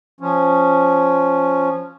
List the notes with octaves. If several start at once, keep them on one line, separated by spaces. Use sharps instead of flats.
F3 C#4